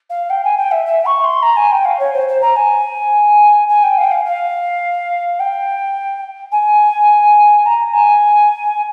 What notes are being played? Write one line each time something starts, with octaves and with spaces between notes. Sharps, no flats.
F5
G5
G#5
G5
E5
E5
C#6
C6
A#5
G#5
G5
F5
C#5
C5
C5
A#5
G#5
G#5
G5
F5
G5
F5
F5
G5
G#5
A#5
G#5